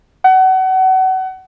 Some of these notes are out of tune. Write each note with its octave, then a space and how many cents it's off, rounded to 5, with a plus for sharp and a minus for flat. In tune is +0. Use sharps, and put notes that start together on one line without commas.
F#5 +30